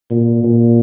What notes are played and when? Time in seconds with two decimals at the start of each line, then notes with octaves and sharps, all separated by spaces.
0.11 A#2
0.44 A#2